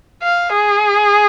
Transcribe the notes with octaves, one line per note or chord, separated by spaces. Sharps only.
F5
G#4